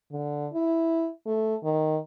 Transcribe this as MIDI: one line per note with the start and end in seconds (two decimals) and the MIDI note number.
0.12 0.47 50
0.54 1.08 64
1.26 1.56 57
1.63 1.98 51